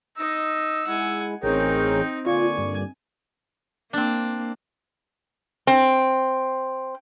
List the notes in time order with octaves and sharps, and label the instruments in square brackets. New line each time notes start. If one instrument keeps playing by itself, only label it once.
[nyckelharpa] D#4 D#5 [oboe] E6
[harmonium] G#3 E4 [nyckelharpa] F#5 G#5
[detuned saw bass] A1 [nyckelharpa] C4 D#4 [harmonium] G#4 A#4 C#5 [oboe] G5
[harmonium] A#2 D3 D5 [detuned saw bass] F4 [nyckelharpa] G#5 [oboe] C#6
[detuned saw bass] G2
[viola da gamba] A#3 [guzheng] C4 D4
[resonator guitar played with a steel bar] C4